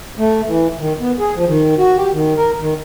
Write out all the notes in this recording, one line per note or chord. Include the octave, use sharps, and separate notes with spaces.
A3
E3
D#3
B3
G#4
F3
D#3
F#4
G4
D#3
A#4
D#3